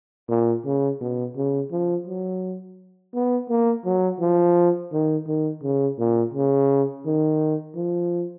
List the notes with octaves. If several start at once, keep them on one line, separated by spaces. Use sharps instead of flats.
A#2
C#3
B2
C#3
F3
F#3
B3
A#3
F#3
F3
D#3
D#3
C#3
A#2
C#3
D#3
F3